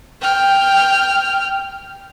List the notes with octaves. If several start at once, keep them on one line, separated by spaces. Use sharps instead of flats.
G5 F6